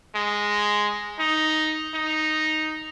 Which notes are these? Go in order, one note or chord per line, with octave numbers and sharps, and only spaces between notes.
G#3
D#4
D#4